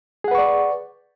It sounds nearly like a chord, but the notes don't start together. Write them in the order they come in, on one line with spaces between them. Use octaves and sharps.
G#4 F#5 B4 C#6 D5